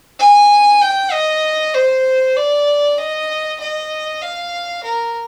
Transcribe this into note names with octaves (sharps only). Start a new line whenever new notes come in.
G#5
G5
D#5
C5
D5
D#5
D#5
F5
A#4